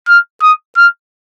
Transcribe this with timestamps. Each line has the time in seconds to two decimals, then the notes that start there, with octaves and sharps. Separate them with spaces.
0.08 F6
0.42 D#6
0.77 F6